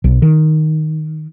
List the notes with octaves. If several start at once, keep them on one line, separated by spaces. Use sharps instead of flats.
B1
D#3